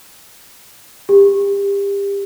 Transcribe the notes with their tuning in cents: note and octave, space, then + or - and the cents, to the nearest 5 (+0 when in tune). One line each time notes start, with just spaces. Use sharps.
G4 +30